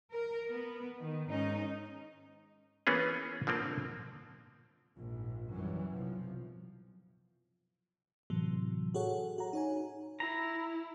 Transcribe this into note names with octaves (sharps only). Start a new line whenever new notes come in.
A#4
B3
D#3
G#2 C#4 D#4
E3 A#3 B3 C#4 G#4
D3 F3 A#3 C4
A#1 G#2
F#2 E3 F#3 G3
B1 C3 F3
A2 C3 E3 F#3
F#4 G#4 A4 C#5 F#5
F#4 F#5 A#5
D#4 C#5 G#5
E4 A#5